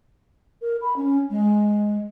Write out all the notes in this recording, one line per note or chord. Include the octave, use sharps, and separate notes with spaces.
A#4
B5
C#4
G#3